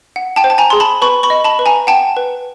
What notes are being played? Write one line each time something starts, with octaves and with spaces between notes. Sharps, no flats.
F#5
G5 A5
C5
A5
G#5 A#5
G#4 C6
A5 B5
B4 B5 C#6
B5 C#6
D#5
A5 B5
B4
G#5 A#5
F#5 G5 A5
B4